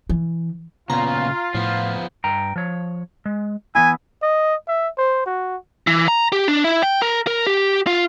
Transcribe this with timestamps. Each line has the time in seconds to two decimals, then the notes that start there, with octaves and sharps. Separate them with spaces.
0.09 E3
0.90 A#2 C#3 B3 F4 A#5
1.55 A2 F3 B3
2.24 G2 G5 A#5
2.56 F3 C#5
3.26 G#3
3.75 E3 B3 E4 G#5
4.23 D#5
4.68 E5
4.98 C5
5.26 F#4
5.87 E3
6.08 A#5
6.32 G4
6.48 D4
6.64 E4
6.83 G5
7.02 A#4
7.27 A#4
7.47 G4
7.87 F4